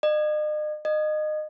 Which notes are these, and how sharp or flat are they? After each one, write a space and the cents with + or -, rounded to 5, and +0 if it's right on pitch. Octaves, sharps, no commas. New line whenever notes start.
D#5 -45
D#5 -25